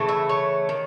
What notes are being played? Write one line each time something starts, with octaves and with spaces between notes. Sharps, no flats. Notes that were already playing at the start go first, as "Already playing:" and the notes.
Already playing: C#3 E3 A3
E5
C#5
D#3